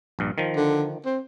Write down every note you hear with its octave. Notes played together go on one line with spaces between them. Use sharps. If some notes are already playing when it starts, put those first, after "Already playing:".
A#1 G2
D#3 F3
D3
C4